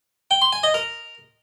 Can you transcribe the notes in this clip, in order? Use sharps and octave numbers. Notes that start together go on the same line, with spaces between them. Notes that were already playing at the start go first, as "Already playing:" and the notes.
G5
C6
G#5
D#5
A#4